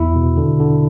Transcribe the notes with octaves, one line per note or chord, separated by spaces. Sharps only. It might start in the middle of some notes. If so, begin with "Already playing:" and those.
Already playing: E2 E4
B2
D3
D3